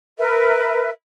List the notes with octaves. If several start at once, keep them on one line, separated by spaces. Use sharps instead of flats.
A#4 B4 E5